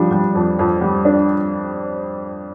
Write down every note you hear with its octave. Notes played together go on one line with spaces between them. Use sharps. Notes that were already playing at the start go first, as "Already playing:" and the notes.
Already playing: F3 G3 D4
G3
F2
F2
G3
D4